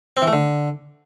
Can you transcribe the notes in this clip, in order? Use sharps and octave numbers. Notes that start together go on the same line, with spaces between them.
C4
E3
A3
D3